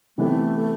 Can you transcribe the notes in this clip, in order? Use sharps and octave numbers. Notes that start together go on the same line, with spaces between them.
C3 E3 A3 B3 E4 G4